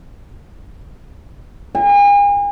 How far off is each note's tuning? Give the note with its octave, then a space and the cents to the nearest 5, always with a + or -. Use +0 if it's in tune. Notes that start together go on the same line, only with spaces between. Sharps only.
G#5 -40